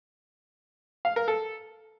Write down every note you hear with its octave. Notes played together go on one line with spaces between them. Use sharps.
F5
A#4
A4